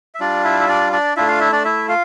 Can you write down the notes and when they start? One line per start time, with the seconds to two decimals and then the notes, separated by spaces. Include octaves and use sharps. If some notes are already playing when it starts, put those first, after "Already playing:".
0.15 E5
0.20 G3 D4 F4 D5
0.44 E4 E5
0.61 E5
0.68 D4 D5
0.92 D4 D5
1.16 A3 D4 E4 F4 E5
1.28 F4 F5
1.40 E4 E5
1.52 D4 D5
1.65 E4 E5
1.89 F4 F5